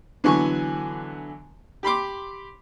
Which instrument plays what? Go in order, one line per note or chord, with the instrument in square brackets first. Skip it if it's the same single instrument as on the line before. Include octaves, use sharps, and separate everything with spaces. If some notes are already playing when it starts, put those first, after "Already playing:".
[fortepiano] D3 E3 F#3 B3 G#5 C#6
G4 B5 C6 D6